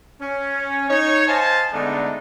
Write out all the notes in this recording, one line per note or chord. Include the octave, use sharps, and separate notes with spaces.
C#4
D#4 C#5
C5 D#5 F5 G#5 A5
D3 G#3 A3 B3 D4 D#4